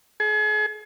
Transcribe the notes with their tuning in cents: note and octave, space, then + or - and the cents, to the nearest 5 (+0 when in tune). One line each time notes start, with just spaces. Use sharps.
G#4 +40